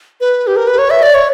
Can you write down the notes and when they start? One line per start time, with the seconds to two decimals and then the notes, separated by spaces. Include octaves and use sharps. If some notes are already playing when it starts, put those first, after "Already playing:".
0.21 B4
0.47 G4
0.56 A#4
0.67 B4
0.78 C#5
0.90 E5
1.03 D5
1.14 C#5